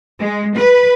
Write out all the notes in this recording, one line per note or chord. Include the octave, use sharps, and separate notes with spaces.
G#3
B4